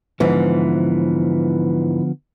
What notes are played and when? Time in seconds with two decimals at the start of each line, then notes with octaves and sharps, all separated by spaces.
0.20 G#2 D3 E3 F3 B3